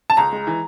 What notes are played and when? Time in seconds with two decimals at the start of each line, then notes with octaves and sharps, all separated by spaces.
0.10 A5
0.17 C#2 A#5
0.32 G#3
0.47 E3